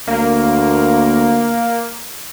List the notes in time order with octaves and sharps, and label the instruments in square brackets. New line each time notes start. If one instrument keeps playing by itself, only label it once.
[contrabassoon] D2 [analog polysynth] A#3